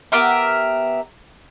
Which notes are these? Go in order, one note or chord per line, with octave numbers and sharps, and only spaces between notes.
B3 G4 A#4 E5